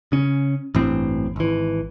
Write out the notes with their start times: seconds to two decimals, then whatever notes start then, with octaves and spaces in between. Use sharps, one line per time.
0.12 C#3 C#4
0.75 A1 G2 E3 C4
1.36 G#1 E3